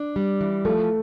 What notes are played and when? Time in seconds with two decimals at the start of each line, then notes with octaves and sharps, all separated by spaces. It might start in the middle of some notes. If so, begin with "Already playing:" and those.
Already playing: D4
0.16 G3
0.41 E3
0.65 F3 A3